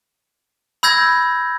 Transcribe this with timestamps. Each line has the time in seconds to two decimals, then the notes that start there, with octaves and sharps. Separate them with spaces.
0.83 B5 E6 G6 G#6 A#6